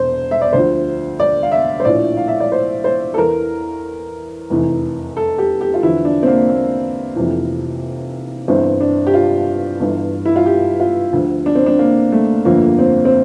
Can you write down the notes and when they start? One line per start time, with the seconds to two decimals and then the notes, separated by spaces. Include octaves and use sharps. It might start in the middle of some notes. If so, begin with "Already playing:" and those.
Already playing: E1 C5
0.31 E5
0.42 D5
0.53 D2 D3 F3 C5
1.20 D5
1.43 F5
1.52 E5
1.80 C5
1.85 A#1 A2 F3 D5
2.17 F5
2.28 E5
2.40 D5
2.52 C5
2.84 C5
3.14 A4
3.17 E2 E3 A#4
4.50 F1 E2 E3
5.17 A4
5.38 G4
5.61 G4
5.74 F4
5.83 E2 D3 F3 E4
6.05 D4
6.23 C4
6.27 A#3
6.49 A#3
7.16 F1 F2 C3 E3
8.48 G1 G2 E3 C4
8.80 D4
9.07 G4
9.14 F4
9.80 G1 G2 E3
10.25 E4
10.36 F4
10.46 G4
10.80 F4
11.13 D2 D3 F3
11.46 D4
11.55 C4
11.66 D4
11.79 A#3
12.12 A3
12.45 G1 F2 D3 F3 A#3
12.79 C4
13.05 C4